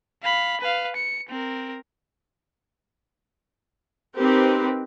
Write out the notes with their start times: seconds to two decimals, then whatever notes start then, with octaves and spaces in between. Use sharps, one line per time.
0.23 F5 B5
0.61 B4 F5
0.96 C#7
1.29 C4 A#4
4.17 C4 D#4 G4 A#4 B4